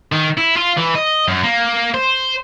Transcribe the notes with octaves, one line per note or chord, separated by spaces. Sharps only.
D#3
E4
F4
E3
D#5
F#2
A#3
C5